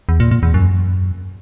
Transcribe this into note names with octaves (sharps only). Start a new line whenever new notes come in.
E2
A#2
A#2
E2
F#2